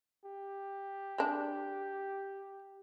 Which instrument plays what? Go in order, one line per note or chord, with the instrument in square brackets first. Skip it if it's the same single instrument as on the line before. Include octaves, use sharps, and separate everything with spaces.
[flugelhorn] G4
[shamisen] G#3 D4